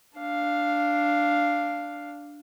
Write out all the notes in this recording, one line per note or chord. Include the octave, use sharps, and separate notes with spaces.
D4 F5